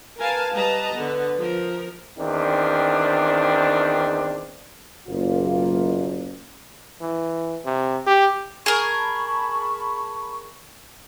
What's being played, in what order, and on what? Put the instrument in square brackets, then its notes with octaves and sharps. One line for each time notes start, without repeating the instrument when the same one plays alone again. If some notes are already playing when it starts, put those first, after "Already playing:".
[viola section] A#4 B4 F5 G#5 A5
G3 B4 D#5 A5 A#5
D3 B3
F3 A#4
[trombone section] E2 D#3 C4 D4
[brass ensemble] F#1 [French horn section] B2 A#3 F4
[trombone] E3
C3
G4
[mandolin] G#4 A#4 [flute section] A5 B5 C#6